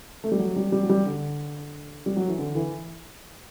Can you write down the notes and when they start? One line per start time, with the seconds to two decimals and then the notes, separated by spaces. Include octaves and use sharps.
0.24 A3
0.31 G3
0.39 F#3
0.56 G3
0.72 G3
0.83 F#3
0.89 G3
1.06 D3
2.06 G3
2.16 F#3
2.28 E3
2.38 D3
2.55 E3